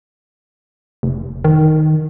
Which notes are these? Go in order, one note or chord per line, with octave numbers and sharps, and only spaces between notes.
F1
D#3